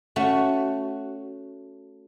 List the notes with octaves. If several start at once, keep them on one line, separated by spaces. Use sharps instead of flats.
A3 C#4 F#4